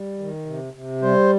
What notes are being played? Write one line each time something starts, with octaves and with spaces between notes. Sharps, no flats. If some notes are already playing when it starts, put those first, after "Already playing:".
Already playing: G3
D#3
C3
C3
G3 C5